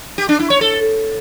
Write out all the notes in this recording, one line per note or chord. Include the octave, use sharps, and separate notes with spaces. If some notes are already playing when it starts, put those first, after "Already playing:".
G4
D4
E4
C#5
A4